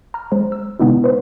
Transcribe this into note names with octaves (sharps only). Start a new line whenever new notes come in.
A#5 F6
G#3 C5
E6
C3 G#3 B3 D#4 E4
B4 C5